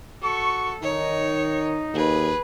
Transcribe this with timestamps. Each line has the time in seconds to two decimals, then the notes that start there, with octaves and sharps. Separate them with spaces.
0.22 F#4 A4 C#6
0.82 D#3 D#4 C#5
1.94 D#2 G#4 B4